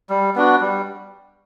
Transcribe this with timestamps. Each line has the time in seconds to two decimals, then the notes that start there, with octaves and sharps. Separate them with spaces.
0.10 G3
0.36 B3 D4 F#4
0.61 G3